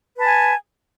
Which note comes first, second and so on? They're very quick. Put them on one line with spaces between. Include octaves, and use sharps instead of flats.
B4 A5 G#5